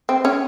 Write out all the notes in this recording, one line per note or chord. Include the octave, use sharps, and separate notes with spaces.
C4
C#4